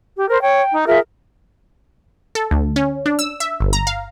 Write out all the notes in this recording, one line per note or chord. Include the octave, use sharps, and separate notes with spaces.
G4
A#4 C5
C#5 G5
D#4
F4 G#4 A#4 E5
A4
D2
C#4
D4
E6
E5
G1
A#5
F5